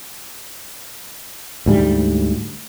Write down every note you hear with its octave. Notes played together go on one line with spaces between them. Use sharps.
D2 G#2 G3